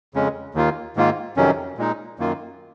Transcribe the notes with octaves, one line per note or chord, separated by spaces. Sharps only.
F2 C#3 G#3 C#4
D#2 D#3 A#3 F4
G#2 D#3 A#3 F4
F2 C3 D#3 F#3 C#4
A#2 G#3 D#4
F#2 D#3 A#3 F4